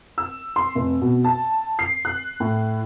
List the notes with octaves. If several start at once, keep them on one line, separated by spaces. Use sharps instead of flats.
E6
C6
F1
B2
A5
C7
F#6
A2